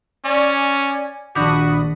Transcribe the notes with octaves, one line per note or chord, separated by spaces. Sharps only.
C#4 D5 G#5
A#1 D#3 D4 F#4 B5 D6 D#6